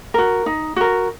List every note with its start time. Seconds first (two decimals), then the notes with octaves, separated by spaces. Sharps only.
0.14 F#4 A#4
0.46 D#4
0.76 F#4 A#4